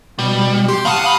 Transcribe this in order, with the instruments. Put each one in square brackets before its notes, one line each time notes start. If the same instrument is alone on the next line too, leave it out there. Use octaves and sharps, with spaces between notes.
[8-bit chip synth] B2 [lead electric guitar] G3
[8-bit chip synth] G4 C6
[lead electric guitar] A2 A5 [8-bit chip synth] F5 F#5 D#6
[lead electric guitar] A5 B5